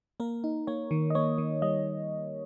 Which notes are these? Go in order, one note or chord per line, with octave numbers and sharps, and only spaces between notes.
A#3 A#4
D#4
A#3 C#5
D#3
D#5
A#3 C#5
D#3
G3 D#5